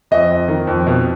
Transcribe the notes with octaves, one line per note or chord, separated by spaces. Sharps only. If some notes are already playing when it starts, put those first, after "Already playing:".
F2 D#5
F2
D#3
F2
B2